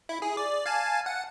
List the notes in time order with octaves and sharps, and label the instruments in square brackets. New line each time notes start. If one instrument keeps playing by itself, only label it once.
[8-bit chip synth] E4
G#4
D5
F5 G#5 A5
F#5